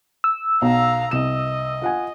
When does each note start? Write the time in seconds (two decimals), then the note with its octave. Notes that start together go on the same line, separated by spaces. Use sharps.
0.24 E6
0.62 B1 F5 A#5
1.11 C2 D#5 E7
1.82 F4 F#5 G#5